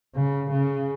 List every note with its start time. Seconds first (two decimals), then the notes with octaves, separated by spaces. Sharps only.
0.15 C#3
0.51 C#3